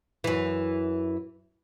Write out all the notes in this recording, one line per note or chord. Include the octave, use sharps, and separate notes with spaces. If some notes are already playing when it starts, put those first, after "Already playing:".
F#2 E3